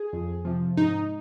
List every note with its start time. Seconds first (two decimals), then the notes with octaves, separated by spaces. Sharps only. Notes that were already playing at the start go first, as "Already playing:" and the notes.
Already playing: G#4
0.13 F2
0.45 C3 F3
0.77 G#2 D#4